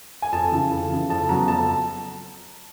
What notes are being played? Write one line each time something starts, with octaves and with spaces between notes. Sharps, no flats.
G#5
F2 A5
C#3 E3
F2
C#3 E3
F2 A5
C#3 F#3 B3 A#5
F2 A5